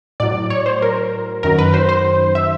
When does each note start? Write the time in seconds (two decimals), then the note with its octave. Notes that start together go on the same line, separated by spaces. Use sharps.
0.20 A2 F#3 D5
0.50 C#5
0.66 C5
0.82 A#4
1.43 F#2 D#3 F#3 A#4
1.58 B4
1.74 C5
1.89 C5
2.35 E5